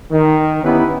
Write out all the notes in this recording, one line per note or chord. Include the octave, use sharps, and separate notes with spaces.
D#3
B3 C#4 D#4 E4 G4 B4